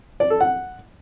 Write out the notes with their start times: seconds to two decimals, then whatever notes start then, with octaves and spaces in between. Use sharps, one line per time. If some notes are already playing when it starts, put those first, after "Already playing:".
0.20 D5
0.30 A4
0.41 F#5